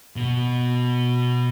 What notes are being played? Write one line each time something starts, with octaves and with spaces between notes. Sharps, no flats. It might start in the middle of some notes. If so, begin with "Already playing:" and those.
B2